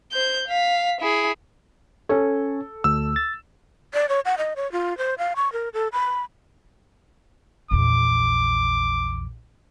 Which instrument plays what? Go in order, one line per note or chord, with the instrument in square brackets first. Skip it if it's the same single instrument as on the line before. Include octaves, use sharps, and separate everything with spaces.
[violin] C5 G6
F5 B6
E4 G#4
[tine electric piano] C#4 C#5 [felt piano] A4
[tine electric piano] D2 [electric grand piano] E6
[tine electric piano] A6
[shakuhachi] D5
C#5
F#5
D#5
C#5
F4
C5
F5
C#6
A#4
A4
B5
[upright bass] A#1 E2 [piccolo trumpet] D6